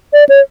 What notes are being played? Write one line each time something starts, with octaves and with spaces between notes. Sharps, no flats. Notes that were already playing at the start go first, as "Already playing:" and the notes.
D5
C#5